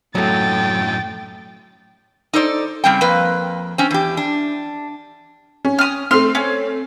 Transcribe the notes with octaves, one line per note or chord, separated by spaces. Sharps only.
F#2 A2 F#3 A3 G5 A6
D#4 A4 C5 D5
C#3 G3 C4 G5
F2 A#3 B4
C4 C#4
E2 G4
D4
C#4
D#6 F6
A3 C4 C6 F6
C#4